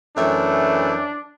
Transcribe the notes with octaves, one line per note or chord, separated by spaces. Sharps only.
F#2 E3 A3 D4